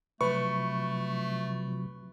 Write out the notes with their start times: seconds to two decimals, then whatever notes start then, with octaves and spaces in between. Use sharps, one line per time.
0.21 C3 F3 F#3 A3 B4 C#6